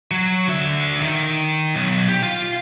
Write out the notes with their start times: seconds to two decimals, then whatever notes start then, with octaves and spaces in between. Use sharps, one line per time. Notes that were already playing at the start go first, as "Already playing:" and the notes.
0.11 F#3
0.48 D3 E5
1.02 D#3
1.75 B1
2.08 G4
2.23 F4 F5